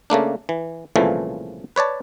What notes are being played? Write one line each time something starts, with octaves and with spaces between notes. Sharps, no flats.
C#3 A3 A#3 D4
E3
C2 A#2 C#3 E3 F3 A3
B4 C#5 D5 A5